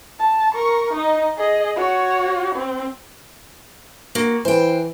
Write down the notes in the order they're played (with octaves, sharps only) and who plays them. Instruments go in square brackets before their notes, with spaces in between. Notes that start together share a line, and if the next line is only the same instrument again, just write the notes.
[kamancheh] A5
A#4 C#6
D#4 D#5
G#4 D#5
F#4 C#5
C4
[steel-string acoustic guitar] A#3 F#4
[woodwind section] E3 [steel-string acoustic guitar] C5 G5